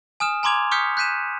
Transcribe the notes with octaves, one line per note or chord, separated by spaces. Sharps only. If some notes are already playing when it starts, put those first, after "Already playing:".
G#5 D#6 F6 E7
G#5 A#5 C6 D6 G#6 F7
C#6 D#6 F6 G6 B6 C#7
F#6 G6 B6 D#7 E7